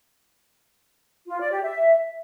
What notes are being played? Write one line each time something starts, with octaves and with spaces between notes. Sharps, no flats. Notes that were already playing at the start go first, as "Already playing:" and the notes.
F4
D5
G4
E5